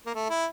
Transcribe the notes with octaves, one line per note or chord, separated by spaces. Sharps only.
A#3
A3
E4